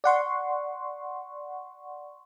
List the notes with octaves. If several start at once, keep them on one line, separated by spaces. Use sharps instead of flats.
D5 F#5 C6 C#6